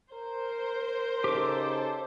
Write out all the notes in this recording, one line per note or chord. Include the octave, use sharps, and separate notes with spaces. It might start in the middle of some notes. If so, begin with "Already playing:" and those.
A#4 C5
C#3 D#4 G4 A4 D6